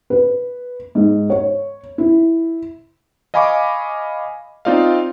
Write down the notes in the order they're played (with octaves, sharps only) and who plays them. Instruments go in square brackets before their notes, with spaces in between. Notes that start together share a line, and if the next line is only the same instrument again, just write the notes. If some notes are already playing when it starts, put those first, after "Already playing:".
[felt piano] B4
G#2
C#5
E4
[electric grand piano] D#5 F5 G#5 B5 C#6 D6
C4 D#4 F4 D5 D#5 F5